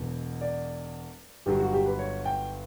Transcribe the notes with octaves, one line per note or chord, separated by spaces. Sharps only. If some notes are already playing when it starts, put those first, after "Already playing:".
Already playing: E1 E2 B2 F#3
D5
G1 G2 F#3 G4
F#4
G4
B4
C#5
G5